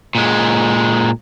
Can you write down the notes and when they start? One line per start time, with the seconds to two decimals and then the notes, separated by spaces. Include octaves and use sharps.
0.15 A#2 G#3